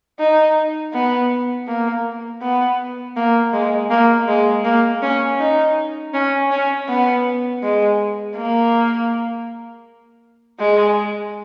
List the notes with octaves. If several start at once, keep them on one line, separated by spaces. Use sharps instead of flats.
D#4
B3
A#3
B3
A#3
G#3
A#3
G#3
A#3
C#4
D#4
C#4
C#4
B3
G#3
A#3
G#3